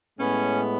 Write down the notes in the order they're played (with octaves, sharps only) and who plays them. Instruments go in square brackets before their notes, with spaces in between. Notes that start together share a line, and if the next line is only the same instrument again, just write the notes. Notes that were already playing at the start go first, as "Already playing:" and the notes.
[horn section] A2 G#3 B3 C#4